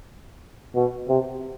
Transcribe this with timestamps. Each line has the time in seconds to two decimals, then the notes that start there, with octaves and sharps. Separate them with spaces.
0.75 B2
1.09 C3